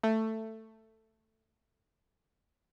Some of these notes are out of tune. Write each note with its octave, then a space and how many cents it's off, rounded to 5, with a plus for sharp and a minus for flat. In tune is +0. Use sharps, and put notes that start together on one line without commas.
A3 +10